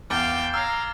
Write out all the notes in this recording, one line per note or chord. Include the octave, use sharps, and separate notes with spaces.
E2 F5 G5 D6 F6 A6
F5 A#5 E6 F6 G#6 C7